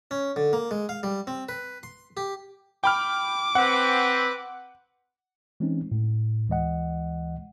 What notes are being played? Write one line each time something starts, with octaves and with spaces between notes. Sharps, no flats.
C#4
D3
A#3
G#3
F5
G3
C4
B4
C6
G4
G5 B5 D6 F6
C4 B4 F#5
E3 G#3 C4 C#4 D#4
A2
D2 E3 G#3 D#5 F#5